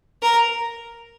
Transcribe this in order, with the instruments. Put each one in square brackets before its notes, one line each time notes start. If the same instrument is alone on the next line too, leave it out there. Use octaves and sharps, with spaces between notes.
[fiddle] A#4